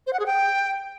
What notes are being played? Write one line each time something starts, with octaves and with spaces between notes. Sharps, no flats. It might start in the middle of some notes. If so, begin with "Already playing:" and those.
C5
F#5
G#4
G5